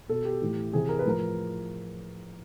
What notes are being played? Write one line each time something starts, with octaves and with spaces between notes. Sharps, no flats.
B2 A4
G4
A2 E3
C3 E3 G#4
A#4
B4
A2 F3 A#4